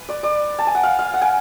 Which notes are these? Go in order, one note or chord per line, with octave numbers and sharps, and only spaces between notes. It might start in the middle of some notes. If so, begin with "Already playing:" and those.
Already playing: B4
D5
D5
A5
G#5
F#5
F5
F5
F#5
G#5